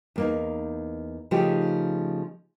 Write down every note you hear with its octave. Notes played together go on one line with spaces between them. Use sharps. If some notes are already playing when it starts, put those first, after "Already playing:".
E2 A#3 D#4
C#3 F3 A3 D#4 G4